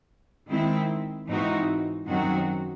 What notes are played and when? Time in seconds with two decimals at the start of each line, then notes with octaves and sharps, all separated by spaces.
0.49 D#3 G#3 C4 E4
1.27 G#2 E3 C4 D#4 F#4
2.08 F#2 D#3 F#3 C4 F#4